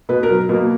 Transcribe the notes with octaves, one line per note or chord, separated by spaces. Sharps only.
B2 B4
A#4
F#3
B2 A#3